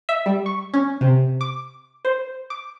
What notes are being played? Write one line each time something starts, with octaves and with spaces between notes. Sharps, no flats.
E5
G3
C#6
C#4
C3
D6
C5
D6